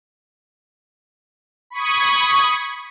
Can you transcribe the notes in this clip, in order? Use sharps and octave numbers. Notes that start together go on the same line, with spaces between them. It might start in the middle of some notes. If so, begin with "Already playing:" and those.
B5 C#6 D#6 G#6